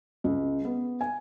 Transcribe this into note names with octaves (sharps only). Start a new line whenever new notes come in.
C#2
B3
G#5